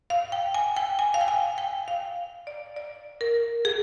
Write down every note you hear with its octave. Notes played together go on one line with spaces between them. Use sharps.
F5
G5
G#5
G5
G#5
F5
G5
G#5
G5
F5
D5
D5
A#4
G#4